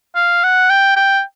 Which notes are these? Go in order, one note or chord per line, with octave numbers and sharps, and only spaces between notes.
F5
F#5
G5
G5